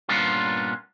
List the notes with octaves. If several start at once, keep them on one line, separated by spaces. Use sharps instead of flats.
G2 A#2 B3 C#4 D4 F4